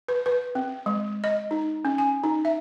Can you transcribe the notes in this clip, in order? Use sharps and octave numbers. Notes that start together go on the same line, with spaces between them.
B4
B4
C4
G#3
D#5
D#4
C#4
G#5
D#4
E5